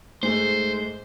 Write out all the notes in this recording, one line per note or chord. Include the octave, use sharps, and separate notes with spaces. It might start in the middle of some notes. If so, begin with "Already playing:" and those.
G#2 G#3 A3 C5